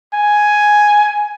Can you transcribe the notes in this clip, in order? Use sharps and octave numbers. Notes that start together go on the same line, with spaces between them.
G#5